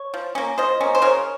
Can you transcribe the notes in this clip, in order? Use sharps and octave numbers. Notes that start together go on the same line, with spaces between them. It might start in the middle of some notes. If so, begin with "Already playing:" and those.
Already playing: C#5
F3
A#3 C#4
F3 C5 D#5
A#3 C#4
C5
C#3 A#4 C#5